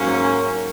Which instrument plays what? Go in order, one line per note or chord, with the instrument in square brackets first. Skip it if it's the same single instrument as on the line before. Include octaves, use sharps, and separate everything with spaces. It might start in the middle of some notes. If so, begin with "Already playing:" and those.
Already playing: [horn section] G#2 F#3 A#3 C#4